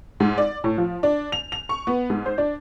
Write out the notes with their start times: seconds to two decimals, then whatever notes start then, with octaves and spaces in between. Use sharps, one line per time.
0.20 G#2
0.38 D5
0.64 A2
0.78 F3
1.03 D4
1.32 F7
1.52 F7
1.69 C#6
1.87 B3
2.10 G#2
2.26 C5
2.38 D4